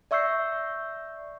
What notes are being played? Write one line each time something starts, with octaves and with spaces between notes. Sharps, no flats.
D5 E5 C#6 E6 G6 C7